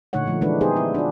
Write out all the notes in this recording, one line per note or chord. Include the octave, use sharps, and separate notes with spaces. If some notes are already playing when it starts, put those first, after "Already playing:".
A#2 D3 A3 D#4 C#5 F#5
D3 F3 A3
E3 G#3 D4 D#4 B4
B3 D#4 G4 G#4 C5
B3 E4
D4 F4